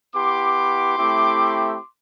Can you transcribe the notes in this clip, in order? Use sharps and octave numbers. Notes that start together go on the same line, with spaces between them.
B3 E4 G4 C6 D6
A3 C4 E4 G4